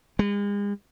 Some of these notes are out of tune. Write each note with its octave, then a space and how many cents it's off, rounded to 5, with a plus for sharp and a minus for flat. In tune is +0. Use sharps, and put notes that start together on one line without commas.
G#3 -40